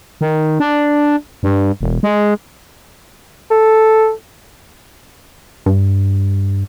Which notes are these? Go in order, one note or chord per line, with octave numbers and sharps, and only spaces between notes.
D#3
D4
G2
E1
G#3
A4
G2